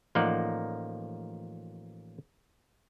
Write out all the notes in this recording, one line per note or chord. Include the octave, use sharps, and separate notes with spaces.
A1 F3 A#3 D#4 D5 F#5